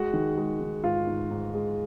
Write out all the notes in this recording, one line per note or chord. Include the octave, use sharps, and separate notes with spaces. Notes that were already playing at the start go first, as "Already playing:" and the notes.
Already playing: G#3 F#4 F#5
D#3
G#3
D#3
G#2 F4 F5
G#2
G#2
G#3